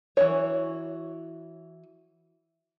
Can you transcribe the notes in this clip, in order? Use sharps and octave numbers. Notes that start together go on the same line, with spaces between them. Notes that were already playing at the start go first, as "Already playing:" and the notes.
E3 F#4 C#5